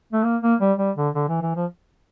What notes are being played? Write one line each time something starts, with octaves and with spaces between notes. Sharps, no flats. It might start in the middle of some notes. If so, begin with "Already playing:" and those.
A3
A#3
A#3
G3
G3
D3
D3
E3
E3
F3